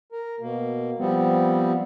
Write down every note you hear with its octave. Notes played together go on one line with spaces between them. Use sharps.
A#4
B2 A#3
F3 G3 B3 C4